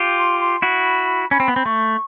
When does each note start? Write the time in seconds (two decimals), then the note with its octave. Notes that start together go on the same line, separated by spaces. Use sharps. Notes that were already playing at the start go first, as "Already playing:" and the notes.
Already playing: F4 G4
0.17 C6
0.40 C6
0.62 E4 F#4 B5
1.31 C#4 B5
1.40 C4
1.48 B3
1.56 C4
1.65 A3 C#6